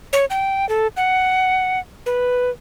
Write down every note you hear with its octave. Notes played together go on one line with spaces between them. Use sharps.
C#5
G5
A4
F#5
B4